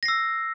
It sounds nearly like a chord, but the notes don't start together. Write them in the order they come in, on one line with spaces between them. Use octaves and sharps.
A#6 C7 E6